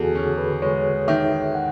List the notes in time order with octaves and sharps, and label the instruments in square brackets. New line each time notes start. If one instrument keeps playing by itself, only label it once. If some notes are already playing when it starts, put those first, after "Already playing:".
Already playing: [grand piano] E2 [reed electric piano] F#4 G#4 A4
[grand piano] C#4 [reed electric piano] G#4
[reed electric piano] B4
[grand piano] G#3 [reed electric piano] C#5
[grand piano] D#3 [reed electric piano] E5
[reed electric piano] F#5